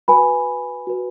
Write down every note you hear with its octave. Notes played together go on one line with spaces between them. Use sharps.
F#4 B4 G#5 B5
F#4 B4